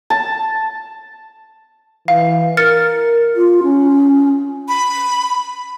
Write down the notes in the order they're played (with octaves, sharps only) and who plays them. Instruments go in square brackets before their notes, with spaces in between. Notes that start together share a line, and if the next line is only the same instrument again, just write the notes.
[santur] A5
[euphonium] E3 [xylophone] F5
[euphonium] A#4 [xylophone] F6 A6 C#7
[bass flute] F4
C#4
[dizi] B5